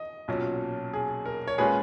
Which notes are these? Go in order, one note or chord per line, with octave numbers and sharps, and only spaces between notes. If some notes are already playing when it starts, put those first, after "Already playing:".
Already playing: D#5
B1 A#2 F#3 C#4
G#4
A#4
C#5
A#2 G#3 C#4 F4 G#4 B4